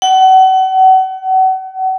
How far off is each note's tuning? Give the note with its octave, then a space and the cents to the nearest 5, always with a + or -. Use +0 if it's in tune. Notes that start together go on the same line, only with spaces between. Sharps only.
F#5 +35